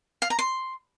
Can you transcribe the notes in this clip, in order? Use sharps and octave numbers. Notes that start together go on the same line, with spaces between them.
F5
A#5
C6